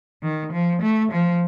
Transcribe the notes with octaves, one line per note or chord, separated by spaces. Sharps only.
D#3
F3
A3
F3